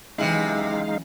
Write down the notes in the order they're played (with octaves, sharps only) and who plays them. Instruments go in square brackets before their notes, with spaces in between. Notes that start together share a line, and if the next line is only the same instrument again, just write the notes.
[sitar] C3 E4 [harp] E3 F#3 C#4 [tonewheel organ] G#3 D#4 F5